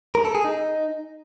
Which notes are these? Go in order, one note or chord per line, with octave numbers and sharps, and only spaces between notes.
A#4
A4
G#4
D#4